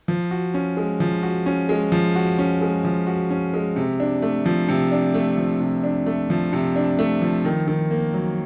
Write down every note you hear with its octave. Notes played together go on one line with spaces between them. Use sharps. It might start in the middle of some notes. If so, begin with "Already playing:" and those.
F3
F#4
C#4
G#3
F3
F#4
C#4
G#3
F3
F#4
C#4
G#3
F3
F#4
C#4
G#3
C3
D4
A3
F3
C3
D4
A3
F3
C3
D4
A3
F3
C3
D4
A3
F3
D#3
D#3
A#3
F#3